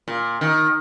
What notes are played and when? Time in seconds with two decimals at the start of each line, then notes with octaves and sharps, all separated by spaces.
0.08 A#2
0.41 D#3